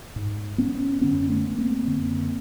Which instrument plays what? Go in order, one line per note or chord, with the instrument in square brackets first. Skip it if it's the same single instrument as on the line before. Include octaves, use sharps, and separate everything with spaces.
[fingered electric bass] G#2
B3 C#4
F#2 D3 B3 C#4
A3 B3
A#3 C4
F#2 D3